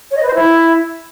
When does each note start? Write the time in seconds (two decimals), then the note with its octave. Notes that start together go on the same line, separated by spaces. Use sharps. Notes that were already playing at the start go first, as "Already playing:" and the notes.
0.11 C#5
0.17 D#5
0.23 B4
0.28 C5
0.34 E4